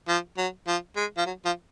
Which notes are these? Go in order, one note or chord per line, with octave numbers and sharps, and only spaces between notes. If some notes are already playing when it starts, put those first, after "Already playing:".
F3
F#3
F3
G#3
F3
F#3
F3